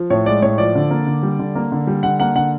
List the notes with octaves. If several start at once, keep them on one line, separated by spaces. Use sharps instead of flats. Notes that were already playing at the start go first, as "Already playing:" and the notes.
Already playing: F3
A2 C#5
G#3 D5
A2 C#5
F3 D5
D3
A#3
D3
G3
D3
A#3
D3
G3
D3 F#5
A#3 F#5
D3 F#5